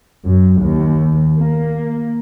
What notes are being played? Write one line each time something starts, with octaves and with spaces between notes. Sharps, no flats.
F#2
D#2
A#3